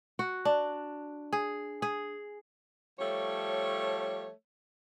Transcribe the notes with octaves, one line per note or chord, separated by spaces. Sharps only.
F#4
D4
G#4
G#4
F3 G3 A3 C#5